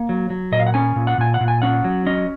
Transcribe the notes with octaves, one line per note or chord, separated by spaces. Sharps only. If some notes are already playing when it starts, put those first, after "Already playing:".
Already playing: A#3
F#3
F#3
A#2 D#5
F5
F#5
C#4 G#5
A#2
F#5
A#2 G#5
F#5
A#2
G#5
C#4 F#5
F#3
C#4 D#5